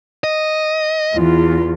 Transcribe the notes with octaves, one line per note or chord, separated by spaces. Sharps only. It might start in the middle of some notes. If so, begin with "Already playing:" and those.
D#5
E2 F4